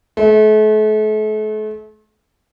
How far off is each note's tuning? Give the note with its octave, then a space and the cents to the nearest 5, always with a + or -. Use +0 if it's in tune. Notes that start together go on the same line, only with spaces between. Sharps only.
A3 -40